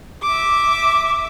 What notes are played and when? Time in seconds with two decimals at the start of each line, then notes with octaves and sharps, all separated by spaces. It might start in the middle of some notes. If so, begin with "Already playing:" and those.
0.23 E5 D6